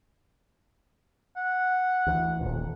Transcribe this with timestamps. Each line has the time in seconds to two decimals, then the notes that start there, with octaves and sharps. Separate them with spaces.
1.37 F#5
2.07 D2 E3
2.41 D#1 A#2